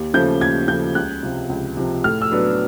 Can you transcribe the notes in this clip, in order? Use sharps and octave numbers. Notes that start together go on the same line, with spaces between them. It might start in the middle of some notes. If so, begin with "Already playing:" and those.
Already playing: D#2
C#3 F3 A3 G6
D#2 G#6
C#3 F3 A3 G6
C#2 F#6
C3 F3
C#2
C3 F3
A2 F6
E6
F#3 B3 D4